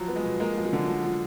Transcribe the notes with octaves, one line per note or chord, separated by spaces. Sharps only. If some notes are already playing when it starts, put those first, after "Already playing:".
Already playing: F3 F#3
B3
G#3
B2
G#3 A#3
F3
F#3
D3
F3
F3